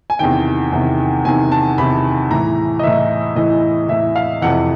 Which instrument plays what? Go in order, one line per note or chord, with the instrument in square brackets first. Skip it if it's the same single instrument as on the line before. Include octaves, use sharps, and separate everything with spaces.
[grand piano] G#5
E2 C3 D#3 G5
E2 C3 D#3
E2 C3 D#3 G#5
A5
E2 C3 D#3 B5
A2 E3 A#5
D#5
A2 E3 E5
A2 E3 D#5
A2 E3 E5
F5
F2 C3 E3 F#5